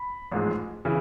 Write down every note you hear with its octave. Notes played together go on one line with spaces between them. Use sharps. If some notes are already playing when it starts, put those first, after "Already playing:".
Already playing: B5
A1 G#2 F3 G#3
C#3 E3